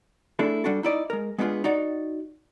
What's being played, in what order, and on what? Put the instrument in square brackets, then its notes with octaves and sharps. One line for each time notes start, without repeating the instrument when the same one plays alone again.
[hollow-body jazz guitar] A3 D4 E4 G#4 A4
G3 D4 F#4 A4
D#4 E4 D5 D#5
G#3 A#4
G#3 B3 D4 D#4 F4 G#4
D#4 F#4 D5